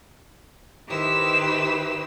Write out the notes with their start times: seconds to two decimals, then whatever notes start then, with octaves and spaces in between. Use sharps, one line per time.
0.87 D#3 E4 G4 B4 C5 E6